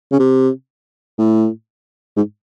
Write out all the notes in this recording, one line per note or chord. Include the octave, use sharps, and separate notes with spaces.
C#3
C3
A2
G#2